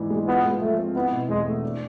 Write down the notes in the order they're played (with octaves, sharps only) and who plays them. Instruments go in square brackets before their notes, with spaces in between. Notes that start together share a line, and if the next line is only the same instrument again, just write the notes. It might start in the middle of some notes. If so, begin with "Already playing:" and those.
Already playing: [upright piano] G#2 E3 D4
G#3
[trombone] B3 [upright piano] F4
[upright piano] G#3
[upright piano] F3 [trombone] A3
[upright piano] C4
[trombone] B3 [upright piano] E4
[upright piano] B2
[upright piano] E2 [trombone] G#3
[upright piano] A3
D4